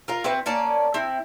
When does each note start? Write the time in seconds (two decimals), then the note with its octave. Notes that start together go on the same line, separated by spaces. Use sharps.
0.08 F4 A#4 F5
0.24 C4 E4 F#4 B4
0.46 A#3 C#4 D5 A5
0.94 C4 E4